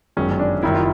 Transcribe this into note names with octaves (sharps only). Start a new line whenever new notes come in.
G1 F#2 D#3 G#3 C#4
C#4
D4
F#1 F#2 D#3 G3 E4
F4